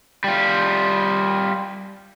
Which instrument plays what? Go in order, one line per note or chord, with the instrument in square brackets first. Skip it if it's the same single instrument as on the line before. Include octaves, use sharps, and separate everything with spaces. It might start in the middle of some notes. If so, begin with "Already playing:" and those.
[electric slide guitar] G3 F4